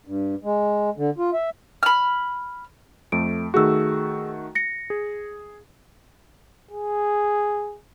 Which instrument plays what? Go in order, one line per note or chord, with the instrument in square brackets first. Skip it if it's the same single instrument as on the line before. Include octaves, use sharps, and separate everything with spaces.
[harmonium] G2
G#3
D3
F4
E5
[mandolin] B5 F6
[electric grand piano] F2 A3 [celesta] D7
[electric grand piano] D#3 A3 F#4 [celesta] G#4 E6
[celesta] A#6 C#7
[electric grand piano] G#4
[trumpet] G#4